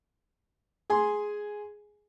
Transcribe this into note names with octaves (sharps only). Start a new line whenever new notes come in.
G#4 G#5 C6